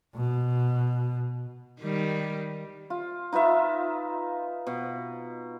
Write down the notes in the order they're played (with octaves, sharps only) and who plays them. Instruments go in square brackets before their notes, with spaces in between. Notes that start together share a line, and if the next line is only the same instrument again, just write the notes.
[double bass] B2
[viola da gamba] D#3 G3
[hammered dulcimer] F4
D#4 F4 B4 E5
B2